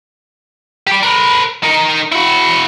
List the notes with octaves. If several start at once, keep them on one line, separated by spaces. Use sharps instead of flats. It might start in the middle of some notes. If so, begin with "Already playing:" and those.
G4 D5
A#4 B4
D#4 A#4
E4 F#4